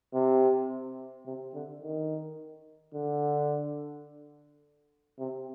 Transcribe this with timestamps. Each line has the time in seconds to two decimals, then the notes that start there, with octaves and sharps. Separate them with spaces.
0.14 C3
1.26 C3
1.54 D3
1.82 D#3
2.94 D3
5.19 C3